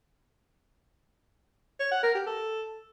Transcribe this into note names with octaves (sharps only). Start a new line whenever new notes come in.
C#5
F#5
A#4
G4
A4